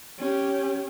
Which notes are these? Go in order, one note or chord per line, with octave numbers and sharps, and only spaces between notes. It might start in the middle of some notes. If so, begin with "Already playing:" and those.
C#4 G4